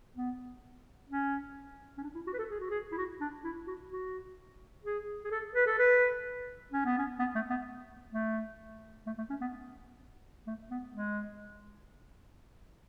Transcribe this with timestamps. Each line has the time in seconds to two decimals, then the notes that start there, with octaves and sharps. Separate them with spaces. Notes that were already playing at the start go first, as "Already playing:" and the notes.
0.16 B3
1.09 C#4
1.98 C#4
2.03 D4
2.15 E4
2.27 F#4
2.33 B4
2.39 A4
2.50 G#4
2.60 F#4
2.70 G#4
2.92 E4
2.97 F#4
3.20 D4
3.44 E4
3.67 F#4
3.90 F#4
4.84 G#4
5.24 G#4
5.31 A4
5.55 B4
5.67 A4
5.78 B4
6.72 C#4
6.85 B3
6.98 C#4
7.19 B3
7.35 A3
7.50 B3
8.12 A3
9.07 A3
9.18 A3
9.30 C#4
9.41 B3
10.47 A3
10.71 B3
10.94 G#3